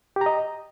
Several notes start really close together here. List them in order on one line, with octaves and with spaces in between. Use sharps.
G4 A#5 D#5